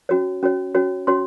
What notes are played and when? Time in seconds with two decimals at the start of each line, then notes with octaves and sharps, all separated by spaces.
0.09 C#4 F#4 C#5
0.43 C#4 F#4 C#5
0.75 C#4 F#4 C#5
1.07 C#4 F#4 C#5 C6